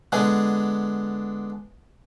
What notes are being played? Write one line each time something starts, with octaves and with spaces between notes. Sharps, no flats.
D3 G#3 B3 D4 G#4